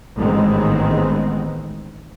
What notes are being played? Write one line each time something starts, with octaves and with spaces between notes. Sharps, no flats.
A1 G#2 D#3 G#3 B3 C4